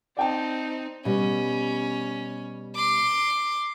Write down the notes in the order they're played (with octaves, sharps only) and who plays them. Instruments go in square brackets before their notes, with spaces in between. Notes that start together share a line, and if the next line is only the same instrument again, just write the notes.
[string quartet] C4 D#4 [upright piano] D5 G5 A5
[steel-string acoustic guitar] B2 G3 [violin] C#4
[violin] C6 D6